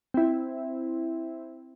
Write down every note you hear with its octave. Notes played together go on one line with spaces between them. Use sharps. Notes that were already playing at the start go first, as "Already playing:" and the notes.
C4 E4